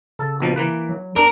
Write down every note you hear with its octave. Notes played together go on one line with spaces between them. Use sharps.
C#3 A4
A#1 B2 F3
E3 A#3 B4
F#3
E2 D4 A#4